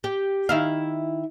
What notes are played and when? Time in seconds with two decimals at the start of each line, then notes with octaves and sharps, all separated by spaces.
0.04 G4
0.49 D#3 E4 F5